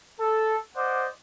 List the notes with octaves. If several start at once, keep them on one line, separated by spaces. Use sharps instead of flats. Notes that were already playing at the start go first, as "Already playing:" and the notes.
A4
C5 D5 D#5 F#5 D6